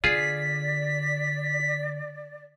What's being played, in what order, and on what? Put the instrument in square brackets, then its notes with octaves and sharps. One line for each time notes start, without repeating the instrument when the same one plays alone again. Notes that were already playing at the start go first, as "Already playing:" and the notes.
[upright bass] D3 [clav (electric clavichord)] F4 G#4 [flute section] D5 [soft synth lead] B6